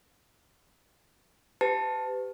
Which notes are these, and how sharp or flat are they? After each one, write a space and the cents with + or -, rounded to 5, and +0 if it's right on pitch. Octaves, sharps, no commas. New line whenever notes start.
G4 +0 B4 +35 A5 +0